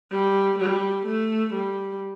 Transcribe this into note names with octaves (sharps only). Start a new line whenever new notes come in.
G3
G3
A3
G3